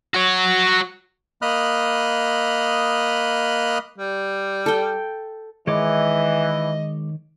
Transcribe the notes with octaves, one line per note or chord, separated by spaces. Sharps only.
F#4 C#5
A#3 D#5 B5 D#6 F6 F#6
G3
A4 G5
D#3 E3 G#3 C#5 D#5 D6